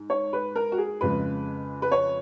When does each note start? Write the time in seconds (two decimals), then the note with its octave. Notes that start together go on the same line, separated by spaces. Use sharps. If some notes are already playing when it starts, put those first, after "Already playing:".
Already playing: G#2
0.10 C#5
0.33 B4
0.56 A#4
0.72 F#4
0.78 G#4
1.01 F2 C#3 G#3 B4
1.82 B4
1.92 C#5